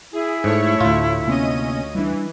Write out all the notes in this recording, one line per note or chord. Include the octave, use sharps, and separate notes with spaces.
E4 G#4
G#2 A3 C#5 C#6
D2 A2 F4
C3 A#3 B3 C#4 D#5 D#7
E3 G3 D4